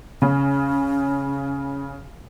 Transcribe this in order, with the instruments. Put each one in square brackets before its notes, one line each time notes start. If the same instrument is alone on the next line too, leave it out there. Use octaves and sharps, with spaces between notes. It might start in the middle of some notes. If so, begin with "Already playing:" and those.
[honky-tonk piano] C#3 [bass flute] C#4